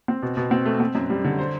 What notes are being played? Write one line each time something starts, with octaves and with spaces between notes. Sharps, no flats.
C4
B2
B2
C4
A3
C4
F#2
G3
D3
C5